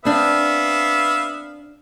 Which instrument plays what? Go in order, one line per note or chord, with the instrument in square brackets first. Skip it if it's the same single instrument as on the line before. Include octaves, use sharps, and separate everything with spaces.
[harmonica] B3 E5 F5 [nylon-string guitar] C4 D4